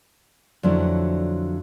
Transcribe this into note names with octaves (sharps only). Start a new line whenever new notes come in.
F2 D3 F#3 A3 E4